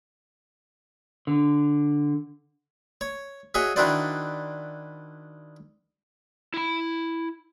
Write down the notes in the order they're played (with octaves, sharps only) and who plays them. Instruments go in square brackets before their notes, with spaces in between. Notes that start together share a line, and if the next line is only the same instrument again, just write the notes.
[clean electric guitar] D3
[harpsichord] C#5
F#4 G#4 C#5 D#5 E5
D#3 D4 E4 F#4 C5 D5
[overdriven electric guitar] E4 B5